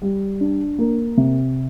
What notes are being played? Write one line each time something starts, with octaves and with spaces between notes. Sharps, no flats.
G3
D4
A#3
C3